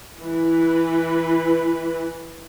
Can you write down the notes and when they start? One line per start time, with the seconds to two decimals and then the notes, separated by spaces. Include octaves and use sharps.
0.19 E3 B4